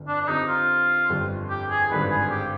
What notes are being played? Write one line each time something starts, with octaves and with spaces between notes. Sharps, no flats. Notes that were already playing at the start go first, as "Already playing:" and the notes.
Already playing: G1 F2 D3
D4
D4
D3 F3 C4 D#4 G4
F4
G1 F2 D3 G3
G4
G#4
G#1 G2 D3 B4
G#4
G4